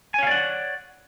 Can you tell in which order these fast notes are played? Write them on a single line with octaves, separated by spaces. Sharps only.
G#5 C#5 F5 D5 F#5